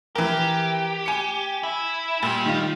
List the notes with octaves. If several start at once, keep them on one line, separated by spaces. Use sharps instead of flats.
E3 G4 A#4
G#5 C#7
E4
A#2 G3
D#3 F4